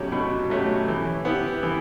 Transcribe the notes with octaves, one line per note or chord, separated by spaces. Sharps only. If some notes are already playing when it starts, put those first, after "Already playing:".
Already playing: B2 F#3 A3 C#4 G4
B2
F#3 A3 C#4 G4
E3
B3 E4 G4
E3